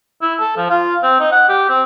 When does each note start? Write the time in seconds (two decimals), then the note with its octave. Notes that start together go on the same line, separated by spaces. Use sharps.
0.22 E4
0.40 A4
0.57 F3
0.70 F4
1.03 C4
1.20 D#4
1.32 F#5
1.49 G4
1.69 C4